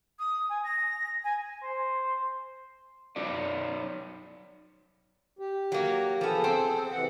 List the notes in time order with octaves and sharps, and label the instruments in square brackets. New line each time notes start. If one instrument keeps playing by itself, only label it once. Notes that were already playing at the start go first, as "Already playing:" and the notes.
[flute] D#6
G#5
A#6
G#5
[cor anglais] C5
[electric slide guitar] F#3 D#4 F#4 D5
[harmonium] G4
[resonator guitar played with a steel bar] F#3 A#3
[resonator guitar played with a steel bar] F3 B3 [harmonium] G#4 A4
[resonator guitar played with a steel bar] C4
[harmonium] C3 E3 F#5